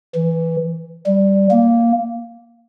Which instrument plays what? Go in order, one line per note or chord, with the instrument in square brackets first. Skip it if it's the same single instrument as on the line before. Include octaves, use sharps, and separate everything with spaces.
[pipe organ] E3
G3
A#3